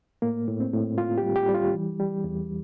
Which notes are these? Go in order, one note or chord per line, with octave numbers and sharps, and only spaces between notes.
A2 A#3
A2
C4
A2
A2 F4
G4
G3
G4
G3
F4
E3
G3
E2